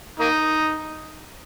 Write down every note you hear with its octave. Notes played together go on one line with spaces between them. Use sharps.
A#3 D#4